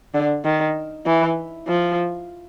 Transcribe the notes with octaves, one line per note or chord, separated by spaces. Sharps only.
D3
D#3
E3
F3